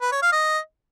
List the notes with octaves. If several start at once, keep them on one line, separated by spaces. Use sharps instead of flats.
B4
C#5
F5
D#5